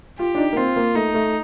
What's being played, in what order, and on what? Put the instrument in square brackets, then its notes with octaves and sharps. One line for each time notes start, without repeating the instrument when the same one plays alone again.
[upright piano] F4 [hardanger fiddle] G4
[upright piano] D4
D#4
A#3
[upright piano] C4 [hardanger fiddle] F4
[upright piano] A#3
[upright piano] A3 [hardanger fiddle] D#4
[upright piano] A3